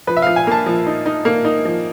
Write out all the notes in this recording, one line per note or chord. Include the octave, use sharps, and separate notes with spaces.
F3 B4
E5
F3 F5
G#5
A#3 A5
F3
D#4
D#4
A#3
D#4
F3